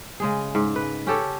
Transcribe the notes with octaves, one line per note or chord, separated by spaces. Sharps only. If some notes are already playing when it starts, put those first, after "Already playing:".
C#3 G#3 G#4
G#2
B4
C#4 G4 A4 C#5